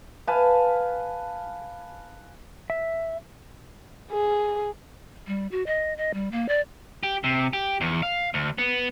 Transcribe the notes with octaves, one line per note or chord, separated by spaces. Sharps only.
B4 F5 G#5 A5
E5
G#4
G3
F#4
D#5
D#5
G3
A#3
D5
G4
C3
G4
E2
F5
D2
B3